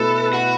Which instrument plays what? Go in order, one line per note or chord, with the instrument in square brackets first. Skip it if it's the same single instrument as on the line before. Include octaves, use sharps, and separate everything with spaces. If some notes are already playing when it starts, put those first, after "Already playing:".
Already playing: [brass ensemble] B2 A3 E4 B4 [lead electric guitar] A4
[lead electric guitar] F#4